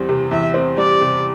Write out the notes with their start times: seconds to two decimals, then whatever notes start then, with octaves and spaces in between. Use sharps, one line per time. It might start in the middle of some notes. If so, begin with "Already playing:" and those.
Already playing: E2 G3 C4
0.09 C3
0.31 E2 E5
0.54 C4
0.77 G3 D5
1.01 C3